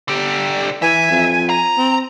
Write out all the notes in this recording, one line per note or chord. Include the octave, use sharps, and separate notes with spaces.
D3 G4
E3 E5 G#5
F2
A#5
C4